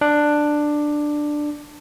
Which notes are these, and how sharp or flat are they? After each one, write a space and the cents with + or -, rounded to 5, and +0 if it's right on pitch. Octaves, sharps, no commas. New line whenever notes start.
D4 +10